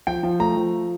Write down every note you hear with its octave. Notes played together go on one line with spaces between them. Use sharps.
F3 G5
F3
A3 A#5
F3